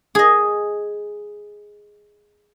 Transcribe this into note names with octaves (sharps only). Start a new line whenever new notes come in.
G#4 D#5